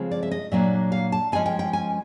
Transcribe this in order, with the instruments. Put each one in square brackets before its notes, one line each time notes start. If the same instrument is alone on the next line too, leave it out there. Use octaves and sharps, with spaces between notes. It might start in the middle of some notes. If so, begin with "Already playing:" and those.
Already playing: [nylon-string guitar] C#3 F3 G#3 C4
D5
E5
D#5
A#2 F#3 A#3 D4 E5
F5
A5
C3 F3 G#3 C#4 G#5
G5
G5
G#5